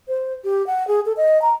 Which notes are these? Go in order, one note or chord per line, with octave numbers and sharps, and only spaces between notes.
C5
G4
F#5
G#4
A4
D#5
A#5